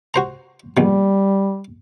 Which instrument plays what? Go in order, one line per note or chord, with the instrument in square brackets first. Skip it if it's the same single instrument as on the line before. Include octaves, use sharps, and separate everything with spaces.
[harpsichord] F#4 C5 A#5
[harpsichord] A#1 B2 [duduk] G3